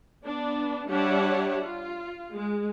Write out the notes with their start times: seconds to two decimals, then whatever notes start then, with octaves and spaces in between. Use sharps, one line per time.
0.23 B3 D4
0.88 G3 D4 G4 C#5 E5 F#5
1.62 F4
2.31 G#3